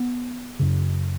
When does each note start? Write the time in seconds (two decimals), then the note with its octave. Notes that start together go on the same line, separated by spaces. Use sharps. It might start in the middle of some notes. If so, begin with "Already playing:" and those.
Already playing: B3
0.59 F#2 C#3